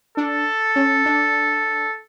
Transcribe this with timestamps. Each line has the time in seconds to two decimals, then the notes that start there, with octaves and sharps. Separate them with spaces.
0.17 D4 A4
0.76 C#4
1.06 D4